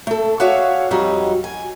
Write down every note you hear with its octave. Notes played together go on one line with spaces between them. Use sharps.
A3 A4
F#4 G#4 C#5 D5 E5 F5
F2 F#3 G3 D#4 F#4
G#5